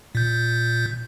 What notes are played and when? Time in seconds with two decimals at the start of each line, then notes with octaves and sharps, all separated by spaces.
0.15 A#2 G6